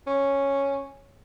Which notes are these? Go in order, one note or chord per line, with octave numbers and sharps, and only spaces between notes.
C#4